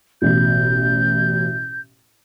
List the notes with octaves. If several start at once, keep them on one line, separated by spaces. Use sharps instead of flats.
A1 B2 G6